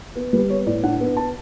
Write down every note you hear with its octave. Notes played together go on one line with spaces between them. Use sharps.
B3
G3 B4
B3 C#5
A2 D5
D4 F#5
B3
B3 A5